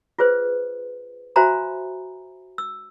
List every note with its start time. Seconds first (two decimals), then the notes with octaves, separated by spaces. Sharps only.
0.18 F4 G#4 B4 C5
1.36 F#4 C5 E5 G#5 A#5 B5
2.58 E6